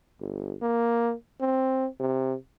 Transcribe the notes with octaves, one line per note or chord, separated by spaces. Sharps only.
G1
A#3
C4
C3